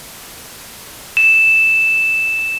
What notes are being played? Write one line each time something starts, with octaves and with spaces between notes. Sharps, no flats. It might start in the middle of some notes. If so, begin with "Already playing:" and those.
E7